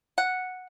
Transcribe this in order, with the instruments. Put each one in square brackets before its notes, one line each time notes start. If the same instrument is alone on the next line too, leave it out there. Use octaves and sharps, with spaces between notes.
[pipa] F#5